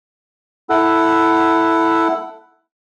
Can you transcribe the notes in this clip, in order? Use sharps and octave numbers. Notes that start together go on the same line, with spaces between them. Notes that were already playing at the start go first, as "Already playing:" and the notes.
E4 A4 F#5